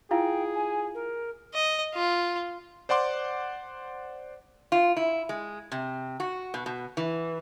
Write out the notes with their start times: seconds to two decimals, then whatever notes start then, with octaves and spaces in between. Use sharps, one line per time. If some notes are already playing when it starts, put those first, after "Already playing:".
0.11 E4 F4 G#4 F5 G5
0.55 G#5
0.95 A#4
1.54 D#5
1.94 F4
2.89 C5 D5 F#5 C6 D6
4.72 F4
4.96 E4
5.29 G#3
5.72 C3
6.20 F#4
6.54 B2
6.66 B2
6.97 E3